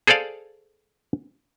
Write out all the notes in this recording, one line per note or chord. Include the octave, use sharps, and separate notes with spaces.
G#4 A4 C5 D5 F5